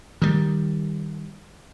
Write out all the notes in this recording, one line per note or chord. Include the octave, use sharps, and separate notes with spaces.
D#3 G3